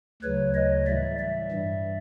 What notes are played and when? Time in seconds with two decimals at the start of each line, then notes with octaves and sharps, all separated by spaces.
0.22 D2 C#3 F#3 B4 C#5
0.54 C#5 D#5
0.87 A2 E3 G3 D5 E5
1.19 D5 E5
1.52 G2 E3 G3